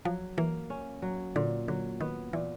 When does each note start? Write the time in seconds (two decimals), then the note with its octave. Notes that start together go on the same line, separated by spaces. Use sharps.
0.05 F3 F#3
0.37 E3 A#3
0.70 C#4
1.02 F#3
1.36 A#2 D3
1.68 D3 F#3
2.01 D#3 B3
2.33 A#2 E3